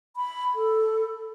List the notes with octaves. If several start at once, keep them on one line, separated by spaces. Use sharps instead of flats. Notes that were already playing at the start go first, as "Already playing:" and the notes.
B5
A4